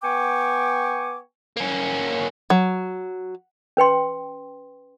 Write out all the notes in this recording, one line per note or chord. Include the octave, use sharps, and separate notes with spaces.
B3 G5 G#5 C#6 D6
A#3 C#4
F#3
C#4 B4 G5 C6